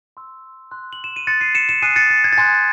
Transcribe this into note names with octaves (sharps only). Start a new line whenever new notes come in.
C6 E6
C6 F#6
F#7
E7
D#7
C6 D#6 F#6 A6 C#7
C7 D#7
C#7 E7
C#7 E7
G#5 D#6 F#6 C7 D#7
A6 C#7
A6
G#6
A6
G#5 C6 D#6 F#6 G#6